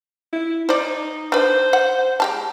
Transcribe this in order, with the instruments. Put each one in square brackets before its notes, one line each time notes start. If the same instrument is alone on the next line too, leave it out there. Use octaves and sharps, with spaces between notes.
[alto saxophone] E4
[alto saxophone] D#4 [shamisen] C5 D5
[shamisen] D4 B4 [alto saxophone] C5
[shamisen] F#5
G#3 G4 A5